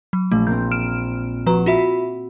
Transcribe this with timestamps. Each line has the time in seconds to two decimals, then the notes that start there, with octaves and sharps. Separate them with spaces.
0.13 F#3
0.32 A#1 A3
0.47 A#3 C4 G6
0.71 F6 D7 E7
1.46 F3 F#4 B4 A#5
1.66 F4 F#4 E5 B5 E6 B6